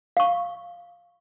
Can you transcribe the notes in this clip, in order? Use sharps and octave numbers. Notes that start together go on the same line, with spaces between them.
F5 C#6